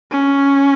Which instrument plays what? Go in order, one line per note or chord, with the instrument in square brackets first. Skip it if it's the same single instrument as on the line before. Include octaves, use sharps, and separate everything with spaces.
[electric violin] C#4